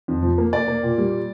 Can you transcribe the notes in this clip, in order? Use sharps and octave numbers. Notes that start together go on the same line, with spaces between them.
F2
F3
A#3
A#3 D5
A#3
A#2
G3